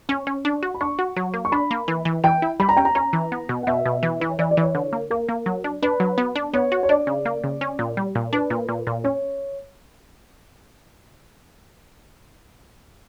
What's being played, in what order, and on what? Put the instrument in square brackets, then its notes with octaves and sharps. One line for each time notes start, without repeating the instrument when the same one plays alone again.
[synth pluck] C#4 [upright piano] C#6
[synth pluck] C#4
D4
F#4
[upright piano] B5
[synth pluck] D4 [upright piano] C#6
[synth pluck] F#4
F#3
A#3
[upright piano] C#6
[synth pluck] D4 [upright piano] B5
[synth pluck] A#3
E3
E3
[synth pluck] E3 [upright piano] G5
[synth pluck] E4
[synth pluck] G3 [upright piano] B5
[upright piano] A#5
[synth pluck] C#4 [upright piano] G5
[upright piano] A#5
[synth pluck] C#4 [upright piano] A#5
[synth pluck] E3
B3
B2
[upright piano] F#5
[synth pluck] B2 [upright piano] E5
[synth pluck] B2
E3
[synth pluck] E3 [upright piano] B4
[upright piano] C#5
[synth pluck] E3 [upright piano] D5
[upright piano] D5
[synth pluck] E3
[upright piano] C#5
[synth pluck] D3
A#3
[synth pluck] A#3 [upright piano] A#4
[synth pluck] A#3
F#3
D4
[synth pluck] D4 [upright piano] B4
[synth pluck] F#3
B3
D4
[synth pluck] B3 [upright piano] C#5
[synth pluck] F#4
[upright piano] C#5
[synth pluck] D4 [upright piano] D5
[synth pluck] C#3
A#3
C#3
C#4
A#2
G3
A#2
[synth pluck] D4 [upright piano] B4
[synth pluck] A#2
A#2
A#2
[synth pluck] C#4 [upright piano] C#5